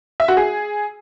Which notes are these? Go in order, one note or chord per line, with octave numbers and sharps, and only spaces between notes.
E5
F#4
G#4